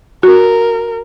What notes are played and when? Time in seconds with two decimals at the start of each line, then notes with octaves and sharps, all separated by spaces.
0.23 F#4 A#4